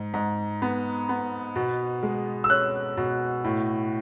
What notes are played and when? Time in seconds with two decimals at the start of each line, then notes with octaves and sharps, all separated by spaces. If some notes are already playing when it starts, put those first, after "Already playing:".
Already playing: G#2
0.14 G#2
0.62 B3
1.09 B3
1.56 B2
2.03 G#3
2.44 E6
2.50 C#4 F#6
2.97 B2
3.44 A2